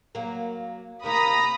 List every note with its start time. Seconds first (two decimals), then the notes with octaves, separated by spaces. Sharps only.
0.15 F#3 A#3
1.03 C3 D#3 A#3 A#5 B5 D#6